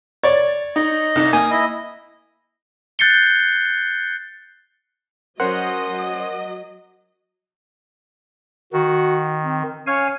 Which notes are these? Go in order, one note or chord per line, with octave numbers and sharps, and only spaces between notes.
C#5 D5 A6
D#4 D#5
C2 D#4
A#3 G#5 D#6
E4 D#5
F#6 G6 A6 C7 C#7 G7
F#3 C#4 A#4 C5 D#5 F#5 C6
D#3 F#4
C4
C#4 C#5 F5 G#5